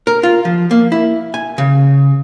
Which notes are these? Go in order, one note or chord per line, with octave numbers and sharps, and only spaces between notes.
A#4
F4
F3
A#3
E4
G#5
C#3